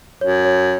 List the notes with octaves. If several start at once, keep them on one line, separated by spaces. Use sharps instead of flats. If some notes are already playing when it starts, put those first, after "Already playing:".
F#2 C#5
C#5